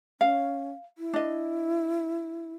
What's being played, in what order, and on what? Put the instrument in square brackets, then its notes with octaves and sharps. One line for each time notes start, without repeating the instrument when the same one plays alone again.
[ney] C#4 [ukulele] F5
[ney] E4
[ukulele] D4 D#5